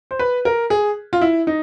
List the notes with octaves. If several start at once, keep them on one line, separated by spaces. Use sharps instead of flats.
C5
B4
A#4
G#4
F4
E4
D#4